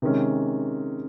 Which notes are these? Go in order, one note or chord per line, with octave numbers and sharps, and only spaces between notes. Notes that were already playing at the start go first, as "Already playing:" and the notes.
C3 D#3 G#3 C#4